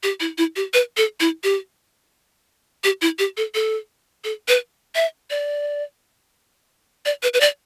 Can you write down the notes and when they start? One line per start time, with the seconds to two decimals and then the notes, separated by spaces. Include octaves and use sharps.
0.03 G4
0.20 E4
0.38 E4
0.56 G4
0.74 B4
0.97 A4
1.20 E4
1.44 G4
2.84 G4
3.02 E4
3.19 G4
3.37 A4
3.55 A4
4.24 A4
4.48 B4
4.95 E5
5.30 D5
7.05 D5
7.23 B4
7.34 B4
7.41 D5